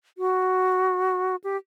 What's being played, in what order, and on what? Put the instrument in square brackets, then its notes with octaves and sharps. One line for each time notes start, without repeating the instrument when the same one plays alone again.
[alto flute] F#4
G4